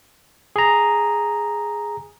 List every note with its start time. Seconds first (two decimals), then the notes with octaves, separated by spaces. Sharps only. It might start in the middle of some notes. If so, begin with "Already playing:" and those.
0.56 G#4 A#5